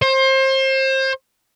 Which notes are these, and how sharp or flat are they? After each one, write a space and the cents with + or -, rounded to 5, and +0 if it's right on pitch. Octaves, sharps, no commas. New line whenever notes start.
C5 +30